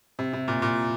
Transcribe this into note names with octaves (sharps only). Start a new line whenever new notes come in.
C3
C3
A#2
A#2